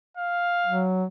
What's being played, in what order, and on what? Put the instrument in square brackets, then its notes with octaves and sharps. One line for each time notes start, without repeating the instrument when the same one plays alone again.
[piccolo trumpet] F5
[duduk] F#3